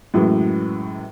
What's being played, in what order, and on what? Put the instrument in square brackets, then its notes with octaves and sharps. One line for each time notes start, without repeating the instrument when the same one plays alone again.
[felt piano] F#2 A2 E3 F#3 G#3